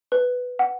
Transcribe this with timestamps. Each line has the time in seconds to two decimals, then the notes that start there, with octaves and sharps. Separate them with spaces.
0.12 B4
0.59 F#5